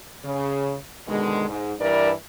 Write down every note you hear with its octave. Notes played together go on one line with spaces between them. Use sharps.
C#3
B2 D3 D#3 G#3
G#2
G2 E3 D4 E4 A#4 D5